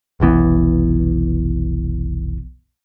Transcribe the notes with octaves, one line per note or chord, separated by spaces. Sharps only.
F1 B1 E3 B3